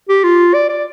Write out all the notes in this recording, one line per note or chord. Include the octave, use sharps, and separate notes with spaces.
G4
F4
D5
D5